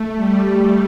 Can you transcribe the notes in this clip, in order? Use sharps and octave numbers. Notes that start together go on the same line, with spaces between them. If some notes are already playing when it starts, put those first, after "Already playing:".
Already playing: A3
G3